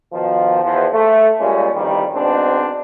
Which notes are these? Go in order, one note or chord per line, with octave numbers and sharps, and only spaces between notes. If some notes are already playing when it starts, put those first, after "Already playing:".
B2 D#3 F3
E2 F3
A3
A#2 G3 G#3 A#3 C#4
A1 F2 D#3 G3
G#2 B2 C4 D4